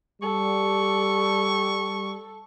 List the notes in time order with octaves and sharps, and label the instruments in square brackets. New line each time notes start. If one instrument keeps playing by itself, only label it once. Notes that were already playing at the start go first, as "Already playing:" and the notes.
[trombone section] G3 [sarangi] A4 [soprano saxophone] C#6